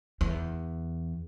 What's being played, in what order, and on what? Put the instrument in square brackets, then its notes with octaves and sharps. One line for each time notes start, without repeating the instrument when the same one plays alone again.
[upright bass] E2